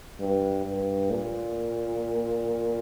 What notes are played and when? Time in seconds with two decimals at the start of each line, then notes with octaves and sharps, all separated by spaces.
0.20 G2
0.65 G2
1.11 A#2